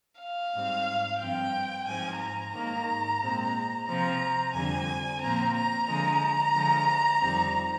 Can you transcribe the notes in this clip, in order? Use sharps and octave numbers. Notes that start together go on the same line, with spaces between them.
F5
G#2 G3 C4
G2 F3 C4 G5
G#2 F3 C4 G#5
A#5
G#2 D#3 A#3
A#2 G#3 C4
C3 F3 C4 A#5
F2 D3 G3 C4 G#5
A#2 F3 C4 A#5
A#5
D3 F3 G#3 A#5
D3 F3 G#3
F2 D#3 G3 C4